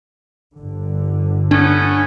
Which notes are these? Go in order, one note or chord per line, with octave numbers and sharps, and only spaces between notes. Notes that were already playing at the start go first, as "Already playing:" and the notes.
G1 D3
A3 B3 C#4 D4